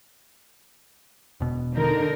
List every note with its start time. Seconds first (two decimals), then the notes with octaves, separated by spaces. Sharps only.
1.40 E1 B2
1.74 D3 D#4 A#4